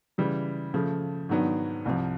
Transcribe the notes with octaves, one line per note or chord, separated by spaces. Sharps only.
C#3 E3 G3
C#3 F3 A3
G#2 D#3 F#3 B3 D4
C2 C3 F3